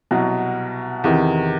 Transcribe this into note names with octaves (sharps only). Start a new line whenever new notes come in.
C2 B2 F#3
E2 C3 D#3